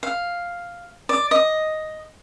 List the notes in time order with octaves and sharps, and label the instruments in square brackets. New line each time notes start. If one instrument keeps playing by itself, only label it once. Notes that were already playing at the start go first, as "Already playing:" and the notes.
[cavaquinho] F5
D5
D#5